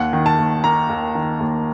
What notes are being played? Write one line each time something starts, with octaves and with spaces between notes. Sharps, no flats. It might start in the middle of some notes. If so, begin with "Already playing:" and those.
Already playing: D#2 F#5
D#3
A5
D#2
A#3 A#5
D#2
D#3
D#2